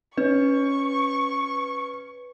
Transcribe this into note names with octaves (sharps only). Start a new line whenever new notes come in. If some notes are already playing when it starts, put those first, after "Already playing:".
C#4 B4 C#6